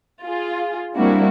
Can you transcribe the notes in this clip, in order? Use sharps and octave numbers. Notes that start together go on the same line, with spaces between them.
F4 G#4
G3 A#3 C4 D4 E4 F#4